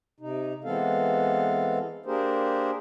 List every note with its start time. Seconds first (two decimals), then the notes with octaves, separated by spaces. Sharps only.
0.20 C3 D#4
0.64 E3 G#3 B3 C4 A4 F5
2.06 A#3 D4 G4 G#4 A#4 C5